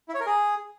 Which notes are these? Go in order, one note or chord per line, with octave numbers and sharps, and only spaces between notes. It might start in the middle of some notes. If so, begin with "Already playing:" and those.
E4
C#5
A#4
G#4